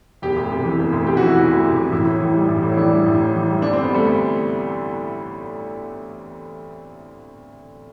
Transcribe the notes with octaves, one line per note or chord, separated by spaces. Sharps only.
E1 G4
D2
C3
E3
E1
D2
C3 G4
E3 F#4
E4
E1 F#4
D2
C3
E3
A1 E4
A2
E3
G3
A1
A2
E4
E3 D4
G3
A1
A2
E3
G3
D2 D4
C4
D3
B3
G3 A3
D2